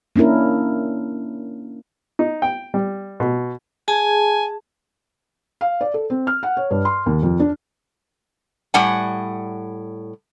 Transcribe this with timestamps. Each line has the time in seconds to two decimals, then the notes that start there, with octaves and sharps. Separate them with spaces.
0.16 A#3 C#4 D4 E4 A#4
2.19 D#4
2.42 G5
2.74 G3
3.20 B2
3.88 G#4 G#5 A5
5.61 F5
5.81 D5
5.94 A4
6.10 C4
6.27 F6
6.43 F#5
6.57 C#5
6.71 G2
6.85 C6
7.06 D#2
7.23 F2
7.40 D4
8.74 A2 G3 F#5 G#5